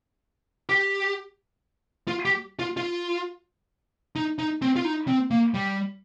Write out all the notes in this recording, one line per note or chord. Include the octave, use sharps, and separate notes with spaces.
G4
F4
G4
F4
F4
D#4
D#4
C4
F4
D#4
C4
A#3
G3